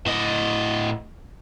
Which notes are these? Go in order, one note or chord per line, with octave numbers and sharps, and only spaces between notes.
A2 D#5